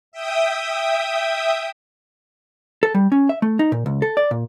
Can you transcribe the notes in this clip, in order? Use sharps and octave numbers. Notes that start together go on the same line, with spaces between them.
E5 G5 D#6
A4
G3
C#4
E5
A3
D#4
A#2
C#2
A4
D5
A#2